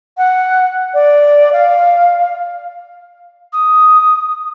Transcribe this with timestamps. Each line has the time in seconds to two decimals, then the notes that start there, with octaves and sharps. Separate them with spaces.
0.17 F#5
0.94 D5
1.52 F5
3.52 D#6